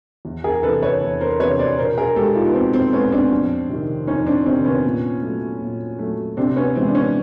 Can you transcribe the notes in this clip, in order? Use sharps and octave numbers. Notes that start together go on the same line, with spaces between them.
E2
G#4 A#4
C3 E3 A4 B4
B4 C#5
E2
A#4 C5
C3 E3 B4 C#5
C5 D5
B2 A#4 C5
G#4 A#4
G#3 G4 A4
D#4 F4
B3
B2 C4
C4
G#3 B3 C#4
C4 D4
F2
C3 D#3
F2 C#4 D#4
C4 D4
C3 D#3 C4
B3 C#4
A#2
F#3 A3
A#2
F#3 A3
C3 C4 D4
B3 C#4
E3 G#3 C4
D4
B3 C#4